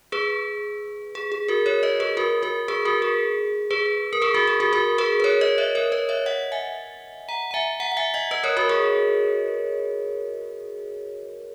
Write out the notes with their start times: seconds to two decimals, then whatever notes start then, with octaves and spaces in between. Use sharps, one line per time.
0.12 G#4 B4
1.15 G#4
1.32 G#4
1.48 F#4 A#4
1.66 A#4 C#5
1.83 B4 D#5
2.00 G#4 B4
2.17 F#4 A#4
2.42 F#4 A#4
2.68 G#4 B4
2.85 F#4 A#4
3.02 G#4
3.71 G#4 B4
4.13 A#4
4.22 G#4 B4
4.34 F#4 A#4
4.47 G#4
4.60 F#4 A#4
4.73 F#4 A#4
4.98 G#4 B4
5.20 B4
5.24 A#4 C#5
5.41 B4 D#5
5.58 C#5 E5
5.75 A#4 C#5
5.92 B4 D#5
6.09 C#5 E5
6.26 D#5 F#5
6.52 E5 G#5
7.29 F#5 A#5
7.51 A#5
7.54 E5 G#5
7.80 F#5 A#5
7.92 F#5
7.97 E5 G#5
8.14 D#5 F#5
8.31 B4 D#5
8.43 A#4 C#5
8.57 F#4 A#4
8.69 G#4